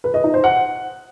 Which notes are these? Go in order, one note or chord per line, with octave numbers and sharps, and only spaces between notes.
B4
D#5
D#4
C5
F#5